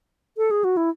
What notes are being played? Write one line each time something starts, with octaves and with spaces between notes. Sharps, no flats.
A4
G#4
F#4
E4